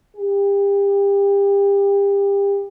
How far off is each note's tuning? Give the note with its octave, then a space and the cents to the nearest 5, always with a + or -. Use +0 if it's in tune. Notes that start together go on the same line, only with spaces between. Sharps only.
G4 +30